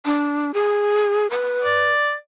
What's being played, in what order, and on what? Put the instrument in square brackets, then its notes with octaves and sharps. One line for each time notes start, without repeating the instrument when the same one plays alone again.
[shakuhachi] D4
G#4
B4
[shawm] D5